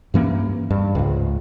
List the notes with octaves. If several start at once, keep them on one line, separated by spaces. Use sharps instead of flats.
G2 E3 A#3 C#4
G2
C#2 G#2